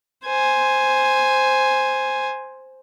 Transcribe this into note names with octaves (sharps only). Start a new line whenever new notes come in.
C5 G#5